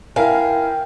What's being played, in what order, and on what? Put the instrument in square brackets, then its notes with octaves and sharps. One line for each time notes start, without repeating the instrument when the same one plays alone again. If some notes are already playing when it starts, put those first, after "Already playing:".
[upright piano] E4 A#4 G#5 [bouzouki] F5 [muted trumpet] G5